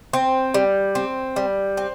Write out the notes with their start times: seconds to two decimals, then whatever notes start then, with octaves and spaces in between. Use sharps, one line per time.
0.13 C4
0.54 G3
0.95 C4
1.36 G3
1.77 C4